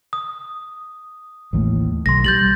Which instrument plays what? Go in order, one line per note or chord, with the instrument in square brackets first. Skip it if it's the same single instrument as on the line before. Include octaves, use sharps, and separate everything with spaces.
[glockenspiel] D#6
[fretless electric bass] A1 D#2 A2
[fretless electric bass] B1 [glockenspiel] C6 A#6
[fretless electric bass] G3 [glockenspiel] G6 A6 F#7